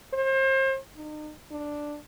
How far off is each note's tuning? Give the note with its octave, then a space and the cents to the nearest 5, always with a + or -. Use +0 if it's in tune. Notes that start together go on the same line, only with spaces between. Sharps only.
C5 +35
D#4 -40
D4 +0